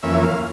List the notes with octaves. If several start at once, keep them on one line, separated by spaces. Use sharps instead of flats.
F2 E3 A#3 C#4 E5
F5